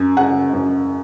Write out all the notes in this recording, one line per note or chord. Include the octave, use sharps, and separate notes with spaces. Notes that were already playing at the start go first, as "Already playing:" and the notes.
Already playing: F#2
C#3 F#5
F#2